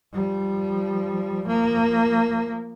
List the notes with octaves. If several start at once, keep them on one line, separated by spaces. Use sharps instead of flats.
F3 G3
F3 A#3